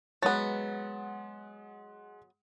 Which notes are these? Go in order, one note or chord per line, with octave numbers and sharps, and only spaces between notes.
F#3 G#3 B3 F#5 A6